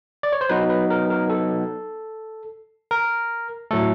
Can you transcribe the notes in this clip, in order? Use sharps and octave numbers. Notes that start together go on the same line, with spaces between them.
D5
C#5
C5
F#3 B3 D#4 B4
B4
A#4
A#4
A4
A#4
A2 F#3 A3 A4